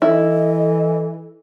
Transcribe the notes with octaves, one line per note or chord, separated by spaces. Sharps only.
E3 E4 A4 D#5